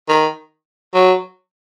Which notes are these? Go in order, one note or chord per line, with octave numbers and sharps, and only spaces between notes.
D#3
F#3